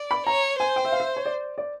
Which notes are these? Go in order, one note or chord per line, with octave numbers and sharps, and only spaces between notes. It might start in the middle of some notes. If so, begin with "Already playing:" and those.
Already playing: D5
B5
C#5 A#5
C5 G#5
G5
E5
F5
E5
C#5
D5
D5